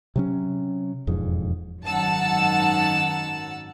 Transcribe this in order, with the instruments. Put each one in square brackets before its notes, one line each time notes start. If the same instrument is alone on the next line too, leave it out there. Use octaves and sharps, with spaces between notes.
[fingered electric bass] C3 F#3 C#4
E1 F2 G#2 G#3
[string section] G#1 F#2 D#3 F#5 A5 E6